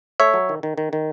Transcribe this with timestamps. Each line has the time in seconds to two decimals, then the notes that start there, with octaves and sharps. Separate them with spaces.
0.20 A3 C#5 E5
0.34 F#3
0.49 D#3
0.63 D#3
0.78 D#3
0.93 D#3